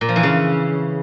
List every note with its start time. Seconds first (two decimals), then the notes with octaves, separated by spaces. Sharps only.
0.01 A#2
0.08 F3
0.16 E3
0.23 C#3